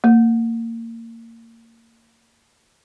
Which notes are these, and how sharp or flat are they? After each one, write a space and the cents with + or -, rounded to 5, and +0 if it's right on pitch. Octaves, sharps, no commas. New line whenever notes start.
A#3 -30